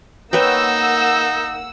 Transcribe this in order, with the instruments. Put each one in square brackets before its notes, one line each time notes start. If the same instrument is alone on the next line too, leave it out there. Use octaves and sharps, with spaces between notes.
[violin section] A#3 F#5 E6 [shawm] D#4 [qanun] B4 C#5 G5